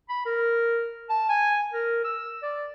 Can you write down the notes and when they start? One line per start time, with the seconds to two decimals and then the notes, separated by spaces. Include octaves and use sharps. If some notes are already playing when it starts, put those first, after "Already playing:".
0.09 B5
0.26 A#4
1.10 A5
1.29 G#5
1.73 A#4
2.04 E6
2.43 D5